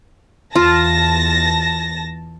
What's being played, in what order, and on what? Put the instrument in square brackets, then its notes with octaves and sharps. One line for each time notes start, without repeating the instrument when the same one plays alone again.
[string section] E2 A5 A#6 [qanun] F4